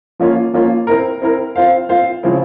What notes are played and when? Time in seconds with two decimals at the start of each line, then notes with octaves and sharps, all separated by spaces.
0.19 F3 A#3 C#4 F4
0.53 F3 A#3 C#4 F4
0.87 C4 E4 A#4
1.22 C4 E4 A#4
1.56 C4 F4 C5 F5
1.89 C4 F4 C5 F5
2.23 C#3 F3 C4 E4